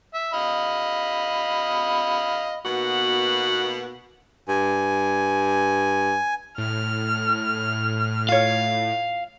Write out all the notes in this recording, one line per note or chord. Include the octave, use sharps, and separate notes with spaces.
E5
D#5 F5 B5
B2 A#3 B3 D#4 F#4
G2 G#5
A2 F6
F4 C#5 F5